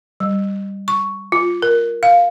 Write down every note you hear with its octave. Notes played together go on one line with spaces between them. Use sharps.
G3
C#6
F4
A#4
F5